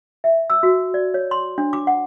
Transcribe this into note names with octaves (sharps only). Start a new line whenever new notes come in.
E5
E6
F#4
D5
C#5
C6
D4
D6
F#5